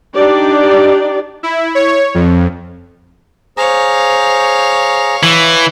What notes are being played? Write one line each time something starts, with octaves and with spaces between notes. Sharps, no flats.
D4 D#4 G4 D5
E4
C#5
F2
G#4 C5 C#5 F5 A#5
E3